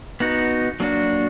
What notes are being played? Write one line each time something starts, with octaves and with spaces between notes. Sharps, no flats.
B3 D#4 F#4
F#3 A#3 D4 F#4